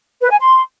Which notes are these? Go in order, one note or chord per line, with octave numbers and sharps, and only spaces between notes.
B4
G#5
C6